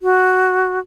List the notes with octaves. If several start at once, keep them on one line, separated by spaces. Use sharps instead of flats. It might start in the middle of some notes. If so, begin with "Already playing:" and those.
F#4